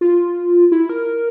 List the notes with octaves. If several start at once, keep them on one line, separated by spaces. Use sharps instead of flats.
F4
E4
A#4